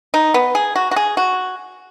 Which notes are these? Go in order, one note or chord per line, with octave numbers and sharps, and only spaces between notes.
D#4
B3
G#4
F#4
F#4
G#4
F#4